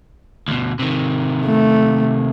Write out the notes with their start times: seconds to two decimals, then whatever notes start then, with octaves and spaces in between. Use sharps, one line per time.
0.48 D2 B2
0.79 C3 D#3
1.46 A3